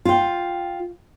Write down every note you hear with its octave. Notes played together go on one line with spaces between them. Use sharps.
F4 G5